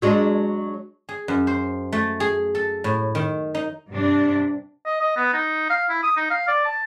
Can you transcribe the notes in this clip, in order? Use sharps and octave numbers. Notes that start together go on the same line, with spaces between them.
F#3 G#3 D4
G#4
F#2
C5
A3
G#4
A4
A2
D#3
D#4
G2 C3 D4
D#5
D#5
B3
D#4
F5
E4
D#6
D#4
F5
D5
A5